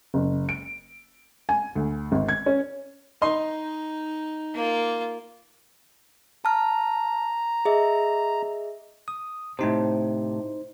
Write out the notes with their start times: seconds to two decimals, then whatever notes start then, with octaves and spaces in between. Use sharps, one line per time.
0.14 F#1
0.49 D7
1.49 G#5
1.75 D2
2.12 G#1
2.29 G#6
2.46 C#4
3.22 D#4 D#5 C6
4.54 A#3 F4
6.45 A5 A#5 F6
7.65 G#4 D#5 E5
9.08 D#6
9.59 A2 C3 D#4 C5